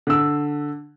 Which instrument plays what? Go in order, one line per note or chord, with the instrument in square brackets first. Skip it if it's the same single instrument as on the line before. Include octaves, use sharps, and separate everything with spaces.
[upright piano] D3 E6